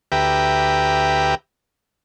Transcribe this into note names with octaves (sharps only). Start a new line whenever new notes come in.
D2 G4 B4 E5 G5 A#5